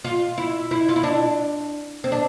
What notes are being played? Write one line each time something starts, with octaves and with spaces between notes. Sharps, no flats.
F4
E4
E4
F4
E4
D4
C4
D4